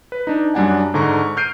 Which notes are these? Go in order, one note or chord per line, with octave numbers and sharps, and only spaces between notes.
B4
D4 D#4
F#2 G3 D4 F#5 G#5
G#2 D3 A#5 C#6
C#6
F6 G6 C7 D7 D#7